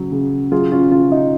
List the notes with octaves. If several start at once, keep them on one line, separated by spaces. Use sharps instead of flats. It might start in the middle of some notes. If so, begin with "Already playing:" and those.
Already playing: C#3 F#3
C#3
F#3 F4 G#4
C#4 F4
C#3 C#4 F4
D#4